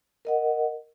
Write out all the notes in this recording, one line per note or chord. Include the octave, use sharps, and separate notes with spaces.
A#4 D#5 F#5